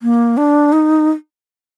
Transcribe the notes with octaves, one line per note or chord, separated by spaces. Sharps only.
A#3
D4
D#4